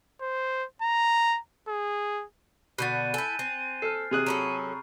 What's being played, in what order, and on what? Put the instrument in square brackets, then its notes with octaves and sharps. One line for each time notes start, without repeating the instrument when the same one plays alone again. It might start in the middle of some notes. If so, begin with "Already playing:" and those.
[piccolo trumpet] C5
A#5
G#4
[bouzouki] B2 D3 B3 [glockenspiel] F#6 G6 A6 [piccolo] D#7
[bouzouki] E4 A4 [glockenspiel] G#5 G6
[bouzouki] C4
[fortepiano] A4 [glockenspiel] F6 C7
[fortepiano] C3 G#4 F#6 [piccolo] D#7
[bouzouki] F#3 C#4 A4 [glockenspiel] A#5 B5 C#6